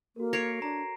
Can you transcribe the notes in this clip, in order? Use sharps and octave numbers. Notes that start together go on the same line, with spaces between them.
A#3 F#4 A4 A#4
C#5 A#6 C7 D7
D4 A#5